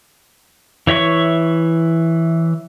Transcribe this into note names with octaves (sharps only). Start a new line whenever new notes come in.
E3 C#5 E5 C#6